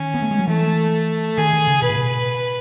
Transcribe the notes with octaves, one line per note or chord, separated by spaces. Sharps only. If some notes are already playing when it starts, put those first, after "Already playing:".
Already playing: D#3 C#4
B3
A3
G#3
F#3
E3 A3
D#3 G#4
D#3
C#3
B2 B4
A2
B2